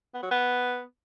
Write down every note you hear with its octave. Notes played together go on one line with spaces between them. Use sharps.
B3
F#3
B3